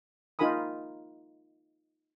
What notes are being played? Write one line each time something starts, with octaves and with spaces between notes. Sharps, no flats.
D#4 F4 A#4 G#5 B5 D#6